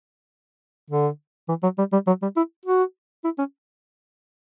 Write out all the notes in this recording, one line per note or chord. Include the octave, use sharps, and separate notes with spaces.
D3
E3
F#3
G3
G3
F#3
G3
E4
F#4
E4
C#4